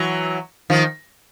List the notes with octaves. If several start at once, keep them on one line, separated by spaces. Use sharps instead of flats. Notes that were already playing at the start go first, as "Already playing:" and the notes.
Already playing: E3 F#3
D#3 F3